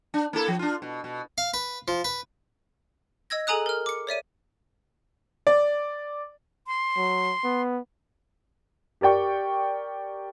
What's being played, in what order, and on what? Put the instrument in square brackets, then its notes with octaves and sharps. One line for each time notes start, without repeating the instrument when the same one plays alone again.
[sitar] D4
A#3 E4 A4
F3
D4 F4
B2
B2
[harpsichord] F5
B4
F3
B4
[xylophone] D#5 E6 G#6 A#6
G#4 A4 G#5 A#5 D#6 F#6
A#4 F6
D6 C#7
C#5 D5 E5 D#7
[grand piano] D5
[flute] C6
[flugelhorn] F#3
B3
[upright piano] G4 A#4 D5 G5 C#6